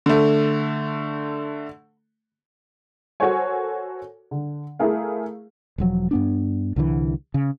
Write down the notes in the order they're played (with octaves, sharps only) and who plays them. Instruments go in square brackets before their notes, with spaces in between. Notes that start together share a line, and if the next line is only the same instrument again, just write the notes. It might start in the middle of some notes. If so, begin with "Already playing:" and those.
[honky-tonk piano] D3 A3
F#4 A4 A#4 C5 C#5 G#5
D3
A3 E4 G#4 A#4 F5
[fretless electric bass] E1 F3 F#3
G2 B3 D4
C2 D3 E3
C#3